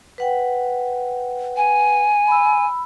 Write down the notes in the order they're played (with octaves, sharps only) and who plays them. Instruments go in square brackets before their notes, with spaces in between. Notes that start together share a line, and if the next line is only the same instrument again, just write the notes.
[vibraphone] B4 F#5 G5
[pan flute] G#5
[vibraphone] B5 E6